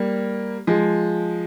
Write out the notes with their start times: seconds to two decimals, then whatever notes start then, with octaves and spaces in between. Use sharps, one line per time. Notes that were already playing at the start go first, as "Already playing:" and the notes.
Already playing: G3 A#3
0.67 F3 G#3